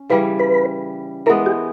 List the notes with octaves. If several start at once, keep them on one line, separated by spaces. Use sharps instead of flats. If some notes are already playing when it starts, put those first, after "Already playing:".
Already playing: C#4
C#3 E3 G3 B4
B4
E3 G#3 B3 A#4
G4